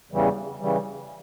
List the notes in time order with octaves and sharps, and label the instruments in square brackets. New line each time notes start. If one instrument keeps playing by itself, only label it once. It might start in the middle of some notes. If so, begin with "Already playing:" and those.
[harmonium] E2 C#3 E3 G3
C#3 E3 G3